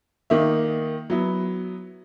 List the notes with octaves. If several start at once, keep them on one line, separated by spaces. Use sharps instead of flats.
D#3 A#3 D#4 E5
F#3 B3 E4